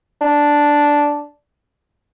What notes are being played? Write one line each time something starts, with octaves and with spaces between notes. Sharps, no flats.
D4